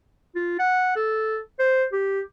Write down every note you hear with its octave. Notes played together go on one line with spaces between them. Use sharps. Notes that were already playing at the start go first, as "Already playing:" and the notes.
F4
F#5
A4
C5
G4